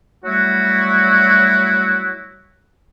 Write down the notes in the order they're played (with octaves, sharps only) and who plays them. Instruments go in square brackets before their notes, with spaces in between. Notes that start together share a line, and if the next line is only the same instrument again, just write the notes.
[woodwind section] F#3 G3 A3 E4 F#4